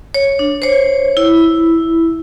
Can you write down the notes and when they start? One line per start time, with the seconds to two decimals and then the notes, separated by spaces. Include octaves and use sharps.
0.14 C#5
0.39 D4
0.62 C5 C#5
1.17 E4